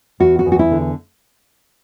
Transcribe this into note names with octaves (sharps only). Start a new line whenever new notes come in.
E2 F#4
F#4
E2
F#4
E4
D3